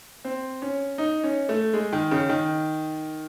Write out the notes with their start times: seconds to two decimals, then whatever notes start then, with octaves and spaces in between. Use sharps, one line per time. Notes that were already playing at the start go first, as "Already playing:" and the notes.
0.25 C4
0.62 C#4
0.98 D#4
1.24 C#4
1.49 A3
1.74 G#3
1.93 D#3
2.11 C#3
2.29 D#3